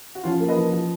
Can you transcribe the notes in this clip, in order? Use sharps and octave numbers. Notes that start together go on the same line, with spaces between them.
F#4
F3 C#4 F4
A#3
B4 D#5
F3
F3